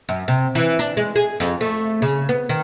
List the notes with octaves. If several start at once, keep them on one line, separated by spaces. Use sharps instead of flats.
F#2
C3
E3
D4
G#3
G#4
F2
A3
C#3
B3
D#3